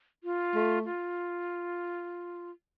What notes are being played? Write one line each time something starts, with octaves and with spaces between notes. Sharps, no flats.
F4
A3
F4